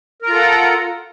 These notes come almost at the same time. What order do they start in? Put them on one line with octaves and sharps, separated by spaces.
A#4 A#5 F4 A4 F#5